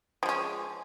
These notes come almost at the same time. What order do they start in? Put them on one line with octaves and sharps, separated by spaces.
F3 G#3 C#4